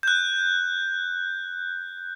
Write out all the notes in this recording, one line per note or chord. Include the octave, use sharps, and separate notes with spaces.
F#6 G6